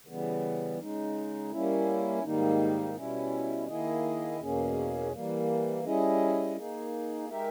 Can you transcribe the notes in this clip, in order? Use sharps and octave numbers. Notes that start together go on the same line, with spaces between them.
C#3 E3 G3 B3
C#3 G#3 D#4
G3 A#3 C#4 E4
G#2 D#3 G3 A#3 D#4
B2 G3 C#4 E4
D#3 A#3 E4 G#4 D#5
E2 B2 A#3 C#4 G#4
E3 G3 A#3
G3 C#4 E4 G#4 D#5
A#3 D#4 G#4
G#3 D#4 G4 A#4 E5